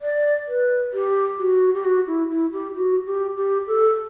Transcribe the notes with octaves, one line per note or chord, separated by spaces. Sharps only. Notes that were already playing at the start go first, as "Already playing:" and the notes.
D5
B4
G4
F#4
G4
F#4
E4
E4
G4
F#4
G4
G4
A4